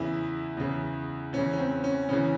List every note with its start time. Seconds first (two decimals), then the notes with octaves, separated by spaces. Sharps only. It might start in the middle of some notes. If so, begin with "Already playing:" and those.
Already playing: E2 C#3 E3 E4
0.57 E2 C#3 E3
1.33 E2 C#3 E3 C#4
1.53 C#4
1.58 C4
1.84 C#4
2.09 E2 C#3 E3 C#4